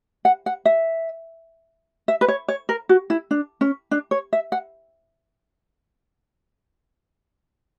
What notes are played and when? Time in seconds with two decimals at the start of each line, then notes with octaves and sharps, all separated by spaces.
0.25 F#5
0.46 F#5
0.65 E5
2.08 E5
2.21 B4
2.28 C#5
2.48 C#5
2.69 A#4
2.89 F#4
3.10 E4
3.31 D4
3.61 C#4
3.91 D4
4.11 C#5
4.33 E5
4.52 F#5